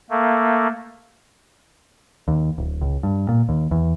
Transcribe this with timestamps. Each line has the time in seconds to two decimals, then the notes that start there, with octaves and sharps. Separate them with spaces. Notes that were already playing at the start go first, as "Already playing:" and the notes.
0.10 A3 A#3
2.28 D#2
2.58 D1
2.81 C#2
3.03 G2
3.29 A#2
3.49 D#2
3.71 E2